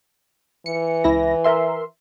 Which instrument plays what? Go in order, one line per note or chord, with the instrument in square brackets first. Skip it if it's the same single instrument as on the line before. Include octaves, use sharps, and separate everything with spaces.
[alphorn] E3 [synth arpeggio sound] C#7
[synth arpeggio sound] C#2 E4 A#6
A#4 E5 C6